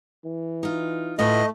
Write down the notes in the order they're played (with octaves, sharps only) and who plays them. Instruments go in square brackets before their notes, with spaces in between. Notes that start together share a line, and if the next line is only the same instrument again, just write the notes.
[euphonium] E3
[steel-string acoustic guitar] D#4 F4
[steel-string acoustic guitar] A2 F4 B4 [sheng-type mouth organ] A3 [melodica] D#5